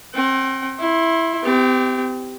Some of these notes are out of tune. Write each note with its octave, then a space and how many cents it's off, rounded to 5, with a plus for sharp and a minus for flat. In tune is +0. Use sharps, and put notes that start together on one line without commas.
C4 +30 G5 -40
E4 +0 C6 +30
C4 -40 G4 +0